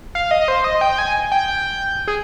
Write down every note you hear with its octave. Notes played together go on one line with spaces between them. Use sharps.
F5
D#5
C5
D#5
G5
G#5
G5
G5
G#4